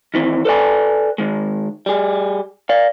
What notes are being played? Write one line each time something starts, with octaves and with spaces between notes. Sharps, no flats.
D#3 E3 C4
A4 B4 D5 G#5
D#3 G#3
G3 G#4
D5 F5